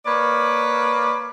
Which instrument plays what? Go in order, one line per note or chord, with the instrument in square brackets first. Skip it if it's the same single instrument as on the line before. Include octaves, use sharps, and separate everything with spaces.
[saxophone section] A#3 B4 C#5 D5